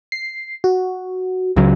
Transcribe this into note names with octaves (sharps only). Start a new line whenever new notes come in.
C7
F#4
C#2 C#3 F#3